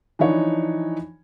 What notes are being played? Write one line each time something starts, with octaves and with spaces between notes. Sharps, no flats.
E3 F3 D4 D#4 C#5